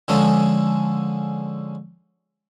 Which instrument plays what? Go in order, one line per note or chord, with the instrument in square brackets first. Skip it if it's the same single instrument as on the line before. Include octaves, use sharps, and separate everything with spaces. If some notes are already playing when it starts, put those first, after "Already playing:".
[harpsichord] D3 F3 G#3 C#4 G#4 A4